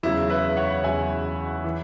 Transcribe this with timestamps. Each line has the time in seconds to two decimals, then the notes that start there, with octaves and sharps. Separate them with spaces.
0.03 E2 C#3 F#3 E4
0.30 B4 E5
0.57 C#5 F#5
0.83 E2 C#3 F#3 E5 G#5
1.64 E3